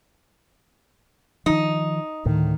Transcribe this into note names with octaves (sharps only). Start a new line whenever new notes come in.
D#3 F3 D#4
D2 A2 D#3